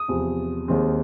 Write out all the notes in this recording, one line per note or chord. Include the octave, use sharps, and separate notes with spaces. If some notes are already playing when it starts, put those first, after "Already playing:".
Already playing: D#6
E2 C3 F3
D#2 D#3 G#3 C4